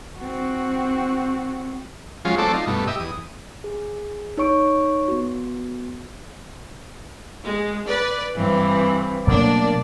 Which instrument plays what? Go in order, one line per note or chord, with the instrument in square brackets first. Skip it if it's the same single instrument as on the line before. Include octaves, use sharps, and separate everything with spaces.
[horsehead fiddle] C4 F#4
[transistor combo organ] F3 F#3 G#3 C#4 F4
F#3 A3 C4 A4 D5
D#4 F4
G2 B2 A3
G4 D#5 E5
E2 D#6
[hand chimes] G#4
D#4 C#5 C#6 D7
B3 F#4
[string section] G#3
B4 D5
[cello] G2 E3 [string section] C4
[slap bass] B2 F#3 A3 [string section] A#3 D4 [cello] D5